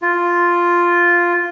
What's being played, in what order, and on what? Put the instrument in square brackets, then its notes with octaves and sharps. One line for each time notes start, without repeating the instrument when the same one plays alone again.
[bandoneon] F4